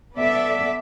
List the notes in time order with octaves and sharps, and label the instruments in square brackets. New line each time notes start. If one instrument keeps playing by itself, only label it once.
[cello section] B3 A4 D5 E5